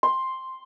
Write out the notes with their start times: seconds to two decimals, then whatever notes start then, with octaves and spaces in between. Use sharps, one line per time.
0.03 C6